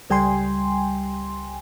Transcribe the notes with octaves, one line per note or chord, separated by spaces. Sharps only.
C#2 G3 G5 G#5 C6